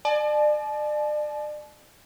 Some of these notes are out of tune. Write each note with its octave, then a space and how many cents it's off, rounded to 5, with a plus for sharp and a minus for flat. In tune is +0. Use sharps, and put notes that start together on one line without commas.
D5 +35 A5 -45